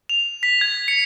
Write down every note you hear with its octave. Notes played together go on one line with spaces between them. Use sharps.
F7
B6
G#6
C#7